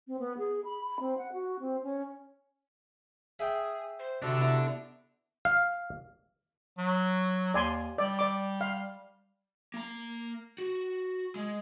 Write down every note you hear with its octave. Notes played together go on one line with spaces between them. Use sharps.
C4
B3
G#4
B5
B5
C4
F#5
F#4
C4
C#4
G#4 E5 G5
C5
C3 D4 F#4 A4
B3 E4
F5
F#3
D#2 D5 G#5 C6
G3 D5
D5 D6
F5
A#3 A#5
F#4
G#3